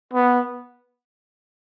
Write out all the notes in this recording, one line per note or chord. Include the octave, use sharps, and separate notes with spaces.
B3